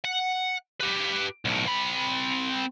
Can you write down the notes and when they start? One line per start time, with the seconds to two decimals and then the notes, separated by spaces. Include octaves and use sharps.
0.04 F#5
0.81 G4 B4
1.45 B1 A2
1.67 C4 B5